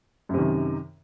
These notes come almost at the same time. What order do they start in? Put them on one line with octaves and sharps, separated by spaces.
F#2 C3 D#3